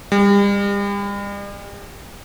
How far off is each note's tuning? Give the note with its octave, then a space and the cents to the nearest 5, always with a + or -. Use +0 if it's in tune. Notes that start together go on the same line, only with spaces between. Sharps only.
G3 +40